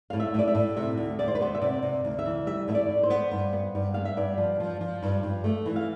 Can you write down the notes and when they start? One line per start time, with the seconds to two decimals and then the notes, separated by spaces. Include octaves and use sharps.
0.10 A2 F5
0.20 E5
0.34 A2 D5
0.48 E5
0.55 A2
0.76 C3 E5
0.98 D2
1.19 D2 D5
1.28 C5
1.35 B4
1.41 B3 C5
1.55 E5
1.61 C3 D5
1.82 C3
2.05 D2
2.19 E5
2.25 E3
2.46 G3 E5
2.68 A2 E5
2.75 D5
2.90 A2
3.03 C5
3.10 B3
3.31 G2
3.53 B3
3.75 G2
3.94 B3 F5
4.05 E5
4.17 G2 D5
4.38 F3
4.60 F3
4.81 F3
5.03 G2
5.23 G2
5.44 A3
5.66 E3
5.76 F5